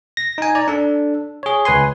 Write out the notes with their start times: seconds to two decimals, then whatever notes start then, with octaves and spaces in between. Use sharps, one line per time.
0.17 A#6
0.38 D#4 G#5
0.55 D5 A#5
0.68 D4 A4
1.43 G#4 C#5
1.65 C#2 B4 G#5 C6